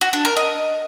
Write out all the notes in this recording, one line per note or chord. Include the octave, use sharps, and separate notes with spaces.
F#4
D4
A#4
D#5